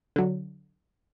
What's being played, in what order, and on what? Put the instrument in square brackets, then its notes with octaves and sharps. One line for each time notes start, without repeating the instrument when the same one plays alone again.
[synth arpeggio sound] D3 F#3